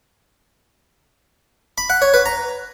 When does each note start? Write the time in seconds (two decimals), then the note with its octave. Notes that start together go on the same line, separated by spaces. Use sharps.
1.78 B5
1.90 F#5
2.02 C#5
2.14 B4
2.26 A#5